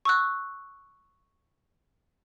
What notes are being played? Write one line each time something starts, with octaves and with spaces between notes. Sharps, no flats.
C#6 E6 F#6